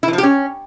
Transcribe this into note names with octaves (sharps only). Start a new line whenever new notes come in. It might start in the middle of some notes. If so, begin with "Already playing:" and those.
E4
E3
F3
G4
C#4